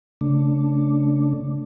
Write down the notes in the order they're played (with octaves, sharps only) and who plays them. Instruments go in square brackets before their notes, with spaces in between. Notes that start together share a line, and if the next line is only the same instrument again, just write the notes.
[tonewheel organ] C#3 A3 D4